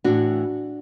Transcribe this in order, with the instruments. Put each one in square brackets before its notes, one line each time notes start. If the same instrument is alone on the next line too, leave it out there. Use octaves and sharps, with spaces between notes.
[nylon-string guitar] A2 E3 D4 F#4